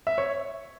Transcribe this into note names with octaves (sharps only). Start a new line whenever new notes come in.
E5
C#5